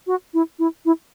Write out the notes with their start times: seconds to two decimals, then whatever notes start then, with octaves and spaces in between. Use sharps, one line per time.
0.07 F#4
0.34 E4
0.59 E4
0.85 E4